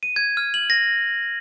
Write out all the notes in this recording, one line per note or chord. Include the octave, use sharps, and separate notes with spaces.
D#7
G#6
F6
F#7
A#6